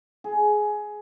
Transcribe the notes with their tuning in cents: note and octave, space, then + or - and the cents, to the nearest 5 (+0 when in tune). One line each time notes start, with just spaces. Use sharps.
G#4 +15